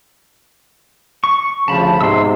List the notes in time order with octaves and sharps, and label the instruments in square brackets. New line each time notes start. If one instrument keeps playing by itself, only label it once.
[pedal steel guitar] C#6
[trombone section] D2 C#3 F3 [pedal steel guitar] A5 B5
[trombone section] B1 G#2 C3 [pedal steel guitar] C6 E6